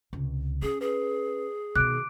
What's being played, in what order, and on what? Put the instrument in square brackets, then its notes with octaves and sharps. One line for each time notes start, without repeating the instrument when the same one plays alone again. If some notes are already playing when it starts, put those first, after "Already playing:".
[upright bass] C#2 C3
[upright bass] C#4 [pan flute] G#4
[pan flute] G#4 [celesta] B4
[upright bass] B2 D#3 [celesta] D6 D7 [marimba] F#6